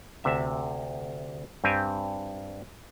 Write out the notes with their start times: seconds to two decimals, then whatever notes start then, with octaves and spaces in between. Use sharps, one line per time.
0.24 D2 C3 E5
1.64 G2 C4 G4 G#5